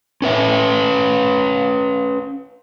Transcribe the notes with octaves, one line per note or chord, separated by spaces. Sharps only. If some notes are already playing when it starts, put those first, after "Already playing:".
C#4 B4 E5